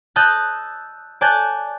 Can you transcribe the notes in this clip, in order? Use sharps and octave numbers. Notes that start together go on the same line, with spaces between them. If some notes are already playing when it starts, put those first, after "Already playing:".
D#5 A5 E6 F#6 G6 A6
D5 G#5 A5 F#6 G6 A6